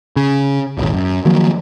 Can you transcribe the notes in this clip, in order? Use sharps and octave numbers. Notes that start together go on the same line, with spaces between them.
C#3
D#1 G#1 D#2
F#2
D#3 F3 F#3 A#3